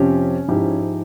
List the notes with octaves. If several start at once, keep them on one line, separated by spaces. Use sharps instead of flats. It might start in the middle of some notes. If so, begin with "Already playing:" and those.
Already playing: F2 C3 F3 C4 C#4 G4
G#2 F3 G#3 E4 G4